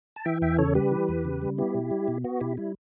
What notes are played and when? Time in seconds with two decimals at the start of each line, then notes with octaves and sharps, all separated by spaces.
0.16 A5
0.25 E3 E5 G5
0.42 E2 E5 G5
0.58 C#3 A4 C#5
0.75 G3 G4 B4
0.91 E3
1.09 E2
1.25 C#3
1.42 G3
1.58 B3 E4 G4
1.75 B2
1.91 G3
2.08 B2
2.24 B3 F#4
2.41 B2 E4 G4
2.57 G3 E4